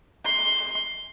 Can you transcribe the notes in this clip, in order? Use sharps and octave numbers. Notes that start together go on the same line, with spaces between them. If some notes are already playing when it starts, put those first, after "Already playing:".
C6